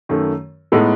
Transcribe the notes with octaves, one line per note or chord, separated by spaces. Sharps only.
F#2 D#3 A3
A2 G#3 B3 D#4 A4